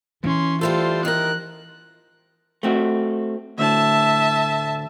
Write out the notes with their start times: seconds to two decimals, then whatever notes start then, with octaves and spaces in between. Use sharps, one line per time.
0.24 E3 C#4 C6
0.61 G3 A3 F4 A4 C5
1.05 D#3 A#4 F#6
2.63 A3 C4 F#4
3.58 D2 A2 D3 E5 A5